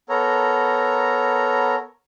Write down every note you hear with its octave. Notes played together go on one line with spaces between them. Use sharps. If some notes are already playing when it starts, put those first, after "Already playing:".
B3 A4 A#4 C#5 A#5